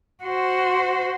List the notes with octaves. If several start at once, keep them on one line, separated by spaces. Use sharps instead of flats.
F#4 C5